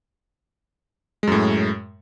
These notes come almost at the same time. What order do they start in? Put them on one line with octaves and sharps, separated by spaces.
G#3 F#2 A2